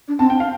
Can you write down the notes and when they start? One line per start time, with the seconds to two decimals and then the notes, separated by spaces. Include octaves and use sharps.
0.08 D4
0.19 C4 A5
0.30 G5
0.40 F5